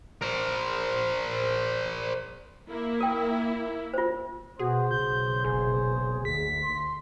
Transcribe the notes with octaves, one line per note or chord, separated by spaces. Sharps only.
A#4 C5
A#3 E4
A#4 G5
F4 C5
B2 F#4 G#4 C5
B1 C#3 G6
F#1 G#4
D2 B6
C6